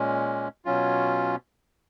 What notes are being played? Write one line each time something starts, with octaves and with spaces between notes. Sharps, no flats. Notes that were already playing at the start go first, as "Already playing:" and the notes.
Already playing: A#2 G#3 C#4
B2 F#3 C#4 F4